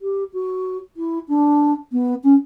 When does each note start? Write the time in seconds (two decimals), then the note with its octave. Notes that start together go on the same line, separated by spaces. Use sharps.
0.01 G4
0.33 F#4
0.96 E4
1.28 D4
1.92 B3
2.23 C#4